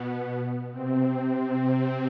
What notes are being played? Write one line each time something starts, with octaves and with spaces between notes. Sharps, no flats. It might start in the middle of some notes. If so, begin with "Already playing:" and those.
Already playing: B2 B3
C3 C4